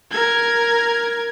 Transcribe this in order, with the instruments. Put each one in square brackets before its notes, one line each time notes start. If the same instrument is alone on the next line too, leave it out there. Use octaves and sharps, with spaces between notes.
[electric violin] A#4 G#6